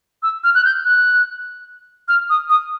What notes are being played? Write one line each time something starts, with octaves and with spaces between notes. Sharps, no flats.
E6
F6
F#6
G6
F#6
F6
D#6
D#6